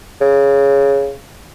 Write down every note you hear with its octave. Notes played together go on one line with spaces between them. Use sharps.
C#3